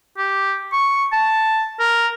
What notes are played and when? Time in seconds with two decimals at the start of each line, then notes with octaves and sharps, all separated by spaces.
0.17 G4
0.73 C#6
1.12 A5
1.80 A#4